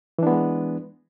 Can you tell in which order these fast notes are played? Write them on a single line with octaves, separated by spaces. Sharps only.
E3 D4 B3 G#3